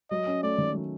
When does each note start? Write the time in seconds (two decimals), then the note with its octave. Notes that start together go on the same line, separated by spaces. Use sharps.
0.10 F#3 D#5
0.27 C#4
0.43 A3 D5
0.58 D#3
0.74 F#3